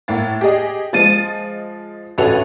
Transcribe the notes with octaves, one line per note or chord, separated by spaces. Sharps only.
A2 A#3 A6
G4 G#4 D#5
F3 G#3 A6 D#7
A1 D2 F#4 A4 B4 F7